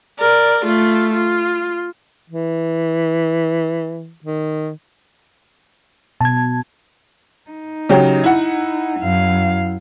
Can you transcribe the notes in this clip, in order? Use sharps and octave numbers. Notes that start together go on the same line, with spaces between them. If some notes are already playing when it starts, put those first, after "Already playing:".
A#4 D5
A3 F4
F4
E3
D#3
B2 A5 G#6
D#4
C#3 F#3 G4
E4 F#5
F#2 F5